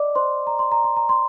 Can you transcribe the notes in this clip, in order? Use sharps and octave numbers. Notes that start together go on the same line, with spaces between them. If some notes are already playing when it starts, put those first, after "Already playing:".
Already playing: D5 D#5 D6
C5 C6
A#5
C6
A#5
C6
A#5
C6